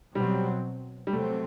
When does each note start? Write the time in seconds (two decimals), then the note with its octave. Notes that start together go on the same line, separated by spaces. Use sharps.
0.15 B2 F#3 G3 C4
1.07 G3
1.13 C3 F#3 A3 C4